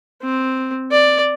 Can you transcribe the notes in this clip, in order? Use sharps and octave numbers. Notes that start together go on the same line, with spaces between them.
C4
D5